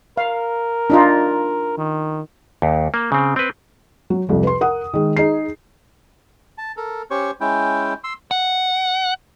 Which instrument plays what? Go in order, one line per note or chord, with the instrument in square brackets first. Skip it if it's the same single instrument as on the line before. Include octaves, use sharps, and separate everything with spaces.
[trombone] A#4 [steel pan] F5
[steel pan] D4 D#4 F4
[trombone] D#3
[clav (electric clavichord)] D#2
A#3
C#3 C4
C4 B4
[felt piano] F#3
C2 F2 F3
B4 C6
A#4 F#5 D#6
D#3 G#3
D#4 G#4 C7
[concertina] A5
A4 A#4
C#4 G4 C5 C#5 C#6
G#3 C#4 E4 G5
C6 E6
[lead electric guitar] F#5